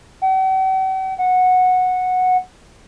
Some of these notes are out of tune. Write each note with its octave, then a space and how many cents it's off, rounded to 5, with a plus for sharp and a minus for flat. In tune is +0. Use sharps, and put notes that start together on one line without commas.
F#5 +45
F#5 -10